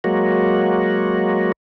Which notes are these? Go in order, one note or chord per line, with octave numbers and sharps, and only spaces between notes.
F#3 G#3 A#3 F#4